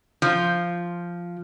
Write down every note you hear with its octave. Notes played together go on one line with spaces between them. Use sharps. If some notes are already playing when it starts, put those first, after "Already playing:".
F3